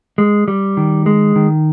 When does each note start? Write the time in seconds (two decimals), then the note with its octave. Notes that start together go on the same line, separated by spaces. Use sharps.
0.18 G#3
0.48 G3
0.77 D#3
1.06 G#3
1.36 D#3